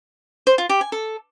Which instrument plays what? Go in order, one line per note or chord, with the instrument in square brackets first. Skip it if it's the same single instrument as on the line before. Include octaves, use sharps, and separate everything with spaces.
[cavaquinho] C5
F4
G4
G#5
A4